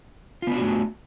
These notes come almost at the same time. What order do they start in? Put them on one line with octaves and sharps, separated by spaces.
F4 B3 D4 F#4 A3